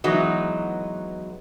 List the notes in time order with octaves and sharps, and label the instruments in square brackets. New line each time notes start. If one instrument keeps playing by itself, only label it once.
[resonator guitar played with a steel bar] E3 F#3 G#3 B3 D#4 F#4